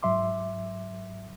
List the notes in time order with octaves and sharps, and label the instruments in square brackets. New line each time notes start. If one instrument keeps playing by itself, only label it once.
[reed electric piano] G#2 F#3 E5 C6 D6